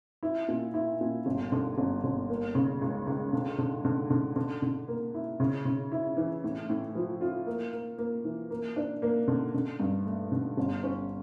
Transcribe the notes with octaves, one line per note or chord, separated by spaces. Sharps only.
E4
A#2
E4
A#2
G1
D3
G1
G1
A#3
C#3
C#2
C#2
D3
D3
D3
D3
D3
D3
A#3
E4
C#3
C#3
E4
E3
A2
A2
F3
F4
A#3
A#3
A#3
E3
A#3
D4
A#3
D3
D3
G2
A3
D3
G1
C#4